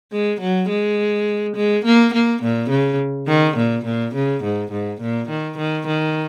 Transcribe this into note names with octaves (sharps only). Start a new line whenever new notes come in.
G#3
F#3
G#3
G#3
A#3
A#3
A#2
C#3
D#3
A#2
A#2
C#3
G#2
G#2
A#2
D#3
D#3
D#3